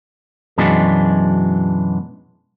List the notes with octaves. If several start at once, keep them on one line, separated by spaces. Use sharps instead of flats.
F#2 B2 E3 F#3 G#3 D4